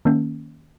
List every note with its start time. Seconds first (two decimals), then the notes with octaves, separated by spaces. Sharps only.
0.05 D#3 A#3 C#4